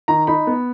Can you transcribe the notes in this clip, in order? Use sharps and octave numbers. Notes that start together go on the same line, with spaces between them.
D#3 A#5
D#4 B5
B3